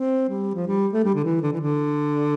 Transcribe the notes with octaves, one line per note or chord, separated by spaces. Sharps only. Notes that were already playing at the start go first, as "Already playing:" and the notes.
Already playing: C4
G3
F3
G3
A3
G3
D3
E3
D3
E3
D3